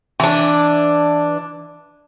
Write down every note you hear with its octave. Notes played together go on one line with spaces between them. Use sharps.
E3 D4